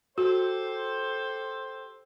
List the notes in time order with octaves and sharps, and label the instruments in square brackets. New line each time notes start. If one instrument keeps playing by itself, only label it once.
[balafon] F#4 [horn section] G4 A4 C5